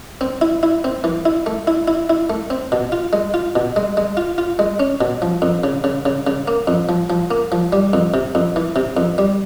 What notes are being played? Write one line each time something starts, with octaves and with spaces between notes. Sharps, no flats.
C4
E4
E4
C4
E3
E4
A3
E4
E4
E4
A3
C4
B2
F4
G#3
F4
B2
G#3
G#3
F4
F4
G#3
C#4
B2
F3
F2
C#3
C#3
C#3
C#3
A#3
F2
F3
F3
A#3
F3
G3
F2
C3
F2
E3
C3
F2
G3